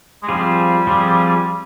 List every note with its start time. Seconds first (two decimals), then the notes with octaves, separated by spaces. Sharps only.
0.23 G#3
0.28 F3 G3 C4 F4 G#4
0.87 F3 C4 F4 G#4